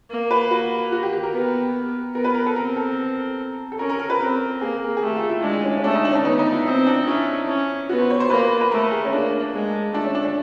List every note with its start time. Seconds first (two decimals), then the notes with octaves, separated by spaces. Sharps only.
0.10 A#3
0.31 B4
0.51 F#4
0.92 F#4
1.03 G4
1.13 G4
1.23 A#4
1.33 B3
2.15 B3 A#4
2.24 B4
2.34 A#4
2.46 A4
2.56 C4 A#4
2.76 A4
3.72 A4
3.79 C#4 A#4
3.89 A#4
4.00 A#4
4.10 B4
4.20 C4 A#4
4.61 A#3 G#4
4.97 G#4
5.03 A3 G4
5.16 F4
5.29 E4
5.43 G#3 D4
5.64 C#4
5.77 C#4
5.84 A3 D4
5.95 D#4
6.05 D4
6.11 C#4
6.15 D4
6.25 B3 D#4
6.39 D#4
6.53 E4
6.66 C4 D#4
6.87 D4
7.07 C#4 E4
7.48 C#4
7.89 B3 F#4
8.00 C5
8.10 C#5
8.20 C5
8.30 A#3 B4
8.61 B4
8.72 A3 A#4
8.92 G#4
9.05 C#4
9.12 A#3 D4
9.54 G#3
9.94 A3 D4
10.05 C#4
10.15 D4
10.25 D4